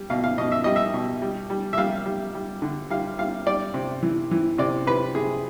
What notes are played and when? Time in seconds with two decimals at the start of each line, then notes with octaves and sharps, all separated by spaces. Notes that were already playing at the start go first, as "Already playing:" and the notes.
Already playing: G3
0.10 B2 F5
0.24 F5
0.38 B2 D#5
0.52 E5
0.64 G3 D#5
0.76 E5
0.94 B2
1.22 G3
1.50 G3
1.73 E5
1.78 G3 F5
2.06 G3
2.35 G3
2.62 D3
2.90 G3 F5
3.19 G3 F5
3.46 G3 D5
3.74 C3
4.02 E3
4.31 E3
4.58 C3 D5
4.87 C3 B4
5.15 C3 G#4